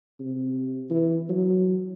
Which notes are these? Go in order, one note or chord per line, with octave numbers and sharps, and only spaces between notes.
C3
E3
F#3